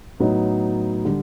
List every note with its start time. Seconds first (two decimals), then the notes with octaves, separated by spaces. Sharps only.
0.20 A2 F#3 B3 D#4
1.05 D3 G3